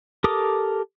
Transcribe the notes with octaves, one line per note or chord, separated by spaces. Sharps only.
G4 A4 A#4 D6 D#6